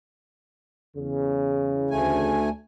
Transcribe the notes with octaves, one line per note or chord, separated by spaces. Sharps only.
E2 C#3
D2 A3 G#5